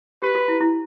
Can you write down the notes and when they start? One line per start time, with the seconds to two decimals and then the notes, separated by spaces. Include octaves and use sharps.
0.22 G4 B4
0.35 F#4
0.48 E4
0.61 E4